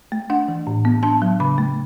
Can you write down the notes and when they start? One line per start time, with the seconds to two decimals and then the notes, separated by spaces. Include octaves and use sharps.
0.12 A3
0.30 D4 F#5
0.48 E3
0.67 A2
0.85 B3
1.03 D4 A5
1.22 F#3
1.40 C#3 B5
1.58 A3